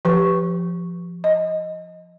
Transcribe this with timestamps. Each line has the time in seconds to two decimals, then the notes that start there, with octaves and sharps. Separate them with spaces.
0.05 F3 G4 B4 C#6
1.24 D#5